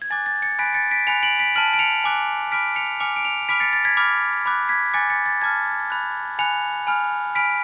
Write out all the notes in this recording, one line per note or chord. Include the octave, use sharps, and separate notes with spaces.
G#6
G#5 D6 F#6 A6
A6
A6 C#7
G#5 B5 F#6 B6 D7
A6 C#7
B6 D7
G#5 B5 F#6 C#7 F7
D7 F#7
B6 D7
A5 F6 D7 F#7
D7
C#7 F7
G#5 D6 F#6
B5 D6 F6 B6 D7
C#7 F7
G#5 D6 F6 C#7 F7
D7
C#7 F7
B5 D6 F6 B6 D7
A6 C#7
A6
G#6 B6
B5 D6 F6
B5 D6 F#6
G#6 B6
G#5 D6 F#6 A6 C#7
A6 C#7
A6
A5 D6 F6 G#6
B5 F#6
G#5 B5 F#6 C#7 F7
G#5 B5 F6
G#5 B5 F6 B6 D7